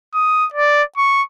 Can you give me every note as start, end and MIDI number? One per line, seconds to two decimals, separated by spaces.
0.14 0.46 87
0.54 0.83 74
0.97 1.22 85